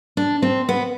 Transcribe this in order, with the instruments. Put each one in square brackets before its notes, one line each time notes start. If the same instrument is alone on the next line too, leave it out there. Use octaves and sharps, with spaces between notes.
[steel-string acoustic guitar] D4
C4
B3